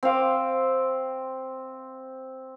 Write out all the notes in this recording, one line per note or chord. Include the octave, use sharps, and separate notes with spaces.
C4 C5 F5 D6